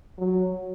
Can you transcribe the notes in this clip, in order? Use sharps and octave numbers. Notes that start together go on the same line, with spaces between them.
F#3